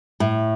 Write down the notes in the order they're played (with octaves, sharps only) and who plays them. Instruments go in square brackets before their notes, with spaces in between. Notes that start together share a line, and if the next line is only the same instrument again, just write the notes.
[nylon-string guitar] A2